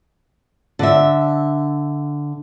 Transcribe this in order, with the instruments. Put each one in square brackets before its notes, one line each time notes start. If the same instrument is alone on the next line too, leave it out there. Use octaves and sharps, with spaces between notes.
[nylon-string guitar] D3 E5